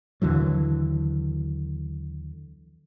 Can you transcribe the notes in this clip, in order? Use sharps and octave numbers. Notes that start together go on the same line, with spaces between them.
D#2 D3 E3 F#3